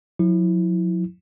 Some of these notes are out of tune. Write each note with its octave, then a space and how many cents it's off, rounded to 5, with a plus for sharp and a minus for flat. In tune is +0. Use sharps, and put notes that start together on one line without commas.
F#3 -45 E4 -10